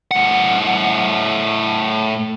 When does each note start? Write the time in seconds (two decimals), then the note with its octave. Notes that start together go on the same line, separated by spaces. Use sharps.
0.11 A2 F#5